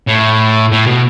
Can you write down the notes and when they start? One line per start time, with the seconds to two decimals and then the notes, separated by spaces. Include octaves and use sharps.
0.08 A2
0.72 A2
0.87 B2